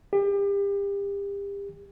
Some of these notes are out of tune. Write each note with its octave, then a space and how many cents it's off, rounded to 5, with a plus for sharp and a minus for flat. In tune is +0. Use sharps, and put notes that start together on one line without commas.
G4 +35